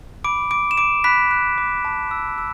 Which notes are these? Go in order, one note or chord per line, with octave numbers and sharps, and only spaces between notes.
B5 D6 D7
D6 D7
E7
D6 D7
B5 F#6 B6
F#6
D6
A5
E6
E6